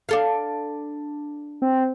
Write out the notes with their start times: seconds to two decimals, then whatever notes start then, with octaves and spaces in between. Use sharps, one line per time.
0.09 D4 A4 F5
1.62 C4